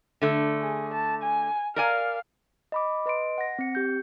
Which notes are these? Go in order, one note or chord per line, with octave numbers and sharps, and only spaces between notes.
D3 A3
G#4
A5
G#5
A#4 D5 F5 G#5
D#5 B5 D6
B4 D#5 C6 D7
F#5 A#6
C4 C#7
G4 G6